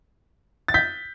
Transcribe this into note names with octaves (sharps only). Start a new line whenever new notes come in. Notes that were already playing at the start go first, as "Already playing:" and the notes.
A6
G6 B6